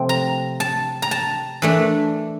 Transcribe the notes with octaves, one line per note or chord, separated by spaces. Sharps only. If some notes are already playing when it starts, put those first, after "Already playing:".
Already playing: C3 F3 A3 C4 G5
A#5
A5
A#5
A5
E3 A3 D4